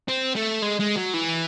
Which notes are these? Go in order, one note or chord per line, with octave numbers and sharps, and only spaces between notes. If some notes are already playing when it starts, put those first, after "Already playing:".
C4
A3
G#3
G#3
F#3
E3